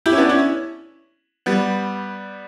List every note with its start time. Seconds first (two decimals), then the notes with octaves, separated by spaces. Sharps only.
0.06 E4 G4
0.12 C#4
0.17 B3 D4
0.29 C#4 E4
1.46 G3 B3